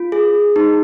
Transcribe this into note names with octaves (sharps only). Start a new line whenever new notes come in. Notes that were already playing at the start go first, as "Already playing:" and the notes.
Already playing: F4
G#4
D#4